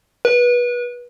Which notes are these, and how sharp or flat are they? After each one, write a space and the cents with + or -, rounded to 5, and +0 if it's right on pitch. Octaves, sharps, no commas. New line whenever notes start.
B4 -25